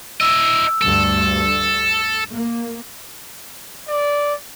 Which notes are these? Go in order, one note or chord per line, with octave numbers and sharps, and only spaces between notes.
E4 D#5 E6
D2 G2 A4
A#3
D5